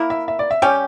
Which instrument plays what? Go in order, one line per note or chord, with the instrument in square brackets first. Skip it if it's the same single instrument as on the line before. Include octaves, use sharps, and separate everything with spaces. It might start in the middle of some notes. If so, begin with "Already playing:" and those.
Already playing: [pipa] A#3 E4 A#4
[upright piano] E5
E5
D5
E5
[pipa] G3 C#4 G4 [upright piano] G5